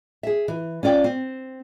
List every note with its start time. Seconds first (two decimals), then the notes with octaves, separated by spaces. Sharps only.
0.23 G#4 E5
0.48 E3
0.83 C#4 F4 D5 G5
1.04 C4